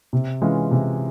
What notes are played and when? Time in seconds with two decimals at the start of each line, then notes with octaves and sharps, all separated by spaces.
0.13 C3
0.42 E3 G#3 C#4 F4
0.71 C3